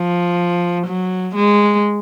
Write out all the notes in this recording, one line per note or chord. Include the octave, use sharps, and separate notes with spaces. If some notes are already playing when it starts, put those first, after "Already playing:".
Already playing: F3
F#3
G#3